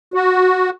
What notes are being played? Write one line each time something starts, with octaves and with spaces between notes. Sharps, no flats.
F#4